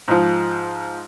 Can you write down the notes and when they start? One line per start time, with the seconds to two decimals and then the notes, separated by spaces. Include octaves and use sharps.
0.08 G#2 F3